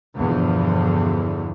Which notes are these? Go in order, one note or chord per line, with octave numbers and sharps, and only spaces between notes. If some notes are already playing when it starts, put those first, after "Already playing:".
E2 G2 B2 D3 F3